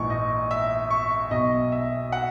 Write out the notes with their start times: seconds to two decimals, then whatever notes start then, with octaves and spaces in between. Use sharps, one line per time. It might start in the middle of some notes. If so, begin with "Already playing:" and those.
Already playing: A#1 G#2 E3 C#6
0.10 D#5
0.51 E5
0.90 C#6
1.31 B1 B2 D#5
1.72 E5
2.12 F#5